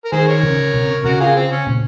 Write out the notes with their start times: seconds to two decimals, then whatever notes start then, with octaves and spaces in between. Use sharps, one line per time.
0.05 A#4
0.12 D#3 G#4 C5
0.27 A#4 C#5
0.43 C#3
0.74 C3
1.04 C#3 F#4 A#4
1.20 F4 G#4
1.36 C4
1.51 C#4
1.67 A#2